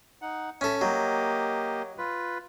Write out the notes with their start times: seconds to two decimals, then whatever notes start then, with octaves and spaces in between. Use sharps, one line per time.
0.22 D#4 F#5
0.61 C#4 A4 E5
0.81 F#3 A#3 G4 D#5
1.98 F4 B4